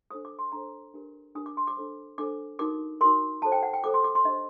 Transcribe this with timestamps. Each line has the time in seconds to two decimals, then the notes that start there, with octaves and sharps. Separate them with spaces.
0.11 D4 A4 C5 D#6
0.25 D6
0.39 C6
0.52 D4 A4 C5 A#5
0.94 D4 G4 A#4
1.35 D4 G4 A#4 D#6
1.46 D6
1.57 C6
1.68 D6
1.77 D4 A4 C5
2.18 D4 A4 C5 D6
2.59 D#4 F#4 A#4 D6
3.01 D#4 F#4 A#4 C6
3.42 F#4 A4 C5 A5
3.52 G5
3.63 F#5
3.74 G5
3.83 F#4 A4 C5 D6
3.94 C6
4.04 D6
4.15 C6
4.25 D4 G4 C5 D#5